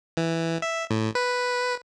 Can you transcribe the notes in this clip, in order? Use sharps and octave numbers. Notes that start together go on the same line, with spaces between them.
E3
E5
A2
B4